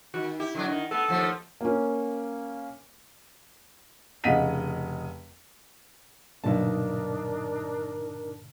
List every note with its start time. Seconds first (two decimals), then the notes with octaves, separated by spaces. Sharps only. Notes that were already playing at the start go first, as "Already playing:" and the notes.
0.14 D#3 F#4
0.40 E4 G4
0.55 D3 F#3 D4
0.68 D#3
0.91 B3 A4
1.08 D#2 F3 A3
1.61 A#3 C#4
4.24 F1 C#3 D#5 F#5 B6 D#7
6.44 B1 G2 A#2 D3 D4 D#4 A#4 A5